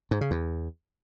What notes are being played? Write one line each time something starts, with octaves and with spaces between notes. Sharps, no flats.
G#2
C#3
E2